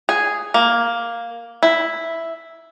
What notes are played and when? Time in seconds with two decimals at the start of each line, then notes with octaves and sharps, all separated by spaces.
0.09 G#4
0.54 A#3
1.63 E4